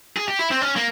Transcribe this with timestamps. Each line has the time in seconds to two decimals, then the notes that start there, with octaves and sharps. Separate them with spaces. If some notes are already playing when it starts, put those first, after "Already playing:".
0.17 G#4
0.28 G4
0.39 E4
0.51 C4
0.61 C#4
0.76 A#3